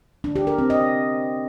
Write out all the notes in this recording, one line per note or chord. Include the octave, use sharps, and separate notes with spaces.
D4
G4
A#4
C4
D#5